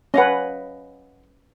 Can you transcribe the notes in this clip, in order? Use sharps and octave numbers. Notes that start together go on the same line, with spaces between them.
C#4 B4 D#5 F5 F#5